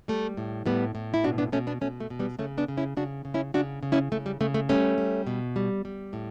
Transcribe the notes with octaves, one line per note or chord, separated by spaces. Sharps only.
G3 A3
A2
A2 G3 B3
A2
E4
B2 D4 F#4
B3 D4
B2 A3 C#4
B3 D4
B2 A3 C#4
A3
B2
G3 B3
C#3 A3 C#4
B3 D4
C#3
C#4 E4
C#3 D4 F#4
C#3
C#4 E4
C#3 D4 F#4
C#3
C#4 E4
C#3 A3
G3
C#3 A3
A3
G3 A3 C#4
G3
B2
G3
G3
A2